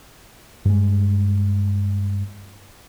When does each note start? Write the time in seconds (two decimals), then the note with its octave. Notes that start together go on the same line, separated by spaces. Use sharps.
0.65 G2 G#3